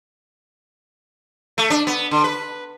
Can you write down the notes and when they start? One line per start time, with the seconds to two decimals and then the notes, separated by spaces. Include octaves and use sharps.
1.58 A3
1.70 D4
1.87 B3
2.11 D3
2.24 B4